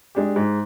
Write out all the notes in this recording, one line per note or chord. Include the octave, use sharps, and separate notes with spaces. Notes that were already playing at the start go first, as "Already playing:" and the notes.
G#3 D4 G4
G#2